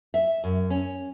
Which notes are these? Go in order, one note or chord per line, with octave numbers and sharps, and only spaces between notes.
E5
F#2
C#4